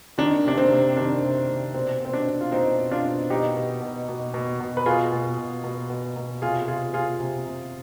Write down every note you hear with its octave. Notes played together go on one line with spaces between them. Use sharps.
D#3 D4
C3 D4
C4
C3
D#3 D4
C3
C3
B2 C4
B2 C4
D4
B2
F4
B2 C4 D#4
B2
D4 F4
B2
B2 D#4 G4
B2
B2
B2
B2
B2
B4
B2 F4 G#4
B2
B2
B2
B2
B2
C3 F4 G#4
C3 F4 G#4
C3 F4 G#4
C3
C3